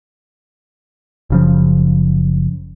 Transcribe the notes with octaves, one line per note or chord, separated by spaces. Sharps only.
F#1 C#3 F3